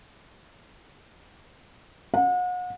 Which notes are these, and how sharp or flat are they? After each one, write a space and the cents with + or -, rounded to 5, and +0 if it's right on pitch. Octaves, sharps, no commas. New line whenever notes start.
F#5 -40